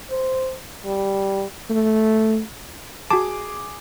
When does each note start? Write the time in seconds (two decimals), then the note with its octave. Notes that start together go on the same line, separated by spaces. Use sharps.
0.10 C5
0.85 G3
1.70 A3
3.11 F#4 G#4 A5 D6